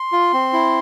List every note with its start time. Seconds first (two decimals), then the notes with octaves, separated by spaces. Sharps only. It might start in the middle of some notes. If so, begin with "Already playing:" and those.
Already playing: C6
0.12 F4
0.33 C4
0.53 E4